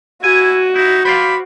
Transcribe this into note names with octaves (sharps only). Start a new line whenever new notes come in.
E4 F#4 G#5
D#4 E4
C5 D5 F5 B5